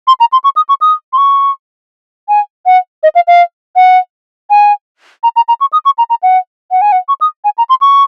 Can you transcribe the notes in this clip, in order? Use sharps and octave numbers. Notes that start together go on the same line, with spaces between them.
C6
A#5
C6
C#6
D#6
C#6
D#6
C6
C#6
G#5
F#5
D#5
F5
F5
F#5
G#5
A#5
A#5
A#5
C#6
D#6
C#6
A#5
A#5
F#5
F#5
G#5
F#5
C#6
D#6
G#5
A#5
C6
C#6